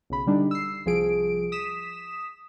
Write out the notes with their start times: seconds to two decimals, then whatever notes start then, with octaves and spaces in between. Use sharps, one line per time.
0.10 B1 C#3 B5
0.26 D3 G3 D4 D#4
0.51 E6 C7
0.86 C2 F3 G#4 D7
1.52 D#6 B6 E7